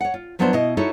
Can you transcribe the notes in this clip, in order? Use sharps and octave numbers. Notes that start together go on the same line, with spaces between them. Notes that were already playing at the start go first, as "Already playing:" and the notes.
C#5 F#5
F4
F3 F#3 B3 D4 E4 C5
B2 E4 D#5
D#4 E4 F#4 A4 C#5